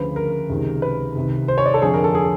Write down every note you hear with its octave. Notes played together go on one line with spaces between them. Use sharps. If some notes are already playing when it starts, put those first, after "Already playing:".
Already playing: D2 C#3 F3 B4
A#4
C#2 C3 D#3
B4
C2 C3 D#3
C5
C#5
D5
A4
F2 D3 F3 G#4
A#4
A4
G#4